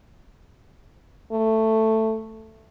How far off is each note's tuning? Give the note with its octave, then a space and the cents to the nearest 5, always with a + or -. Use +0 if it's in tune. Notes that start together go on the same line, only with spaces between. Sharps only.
A3 +10